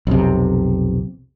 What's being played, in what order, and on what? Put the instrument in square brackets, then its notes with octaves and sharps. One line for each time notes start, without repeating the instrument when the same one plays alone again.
[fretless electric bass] B1 F2 C3